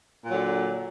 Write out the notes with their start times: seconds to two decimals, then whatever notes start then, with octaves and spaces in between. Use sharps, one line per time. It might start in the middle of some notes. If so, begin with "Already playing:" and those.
0.23 A#2
0.28 F#3
0.33 D3